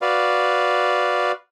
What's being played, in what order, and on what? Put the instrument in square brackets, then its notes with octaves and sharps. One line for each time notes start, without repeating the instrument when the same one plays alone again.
[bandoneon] F#4 B4 D5 F5